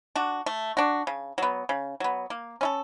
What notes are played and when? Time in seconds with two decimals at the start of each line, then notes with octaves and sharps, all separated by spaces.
0.16 D4 F#4
0.46 A3
0.77 D4 F#4
1.07 C#3
1.38 F#3 B3
1.69 C#3
2.00 F#3 B3
2.30 A#3
2.61 C#4 E4 A4